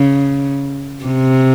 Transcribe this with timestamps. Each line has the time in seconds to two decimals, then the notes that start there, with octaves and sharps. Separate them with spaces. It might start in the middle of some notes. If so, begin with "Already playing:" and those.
Already playing: C#3
1.05 C3